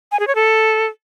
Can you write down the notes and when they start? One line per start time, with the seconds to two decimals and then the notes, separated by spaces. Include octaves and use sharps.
0.12 G#5
0.20 G#4
0.27 C#5
0.35 A4